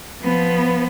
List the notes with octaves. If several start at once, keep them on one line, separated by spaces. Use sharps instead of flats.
F3 B3